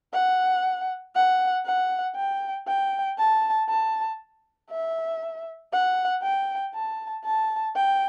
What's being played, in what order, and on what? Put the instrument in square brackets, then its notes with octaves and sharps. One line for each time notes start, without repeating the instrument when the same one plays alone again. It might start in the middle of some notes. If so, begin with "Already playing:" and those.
[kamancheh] F#5
F#5
F#5
G5
G5
A5
A5
E5
F#5
G5
A5
A5
G5